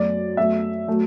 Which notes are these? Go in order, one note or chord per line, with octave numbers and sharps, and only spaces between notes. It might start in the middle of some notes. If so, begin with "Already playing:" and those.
Already playing: F#2 F#3 A3 D5
F#2 F#3 A3 E5
F#3 A3